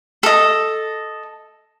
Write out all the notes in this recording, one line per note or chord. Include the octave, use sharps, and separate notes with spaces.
A4 D#5